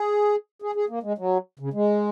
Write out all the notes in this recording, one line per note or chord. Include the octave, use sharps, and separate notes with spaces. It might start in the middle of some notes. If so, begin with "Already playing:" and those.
Already playing: G#4
G#4
G#4
A#3
G#3
F#3
C#3
G#3